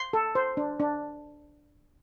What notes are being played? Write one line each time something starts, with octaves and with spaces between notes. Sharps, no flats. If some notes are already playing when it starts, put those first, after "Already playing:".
Already playing: C6
A4
C5
D4
D4